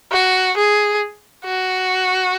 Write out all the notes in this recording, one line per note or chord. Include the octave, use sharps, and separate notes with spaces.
F#4
G#4
F#4